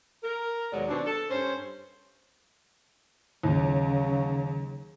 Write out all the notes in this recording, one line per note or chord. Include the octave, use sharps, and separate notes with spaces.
A#4
D#2 B2 F#3 G#3 D5
B2 D#3 C4 D4
A4
G2 C#4 C5
D#2 C#3 F#3